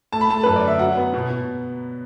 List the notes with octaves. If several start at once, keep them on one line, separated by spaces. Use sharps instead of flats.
A3 A5
B5
A3 A5
F#2 B4
D5
D3 E5
F#3 F#5
B3
B2
B2